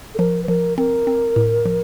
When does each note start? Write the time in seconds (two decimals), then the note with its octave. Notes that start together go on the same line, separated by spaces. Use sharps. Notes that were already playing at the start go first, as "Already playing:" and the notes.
0.15 A4
0.19 F3 A#4
0.44 B4
0.48 F3 A#4
0.78 C4 A#4
1.07 C4
1.36 A2
1.65 F3